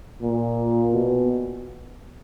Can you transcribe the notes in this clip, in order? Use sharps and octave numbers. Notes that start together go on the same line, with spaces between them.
A#2
B2